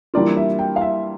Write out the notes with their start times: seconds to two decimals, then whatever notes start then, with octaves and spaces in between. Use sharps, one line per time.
0.14 E3 G3 A#3 D4 F4 D5
0.37 E5
0.59 G5
0.76 F5
0.81 E5